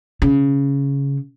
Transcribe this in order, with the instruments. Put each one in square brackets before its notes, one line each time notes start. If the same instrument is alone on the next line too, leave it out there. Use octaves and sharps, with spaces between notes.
[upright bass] C#3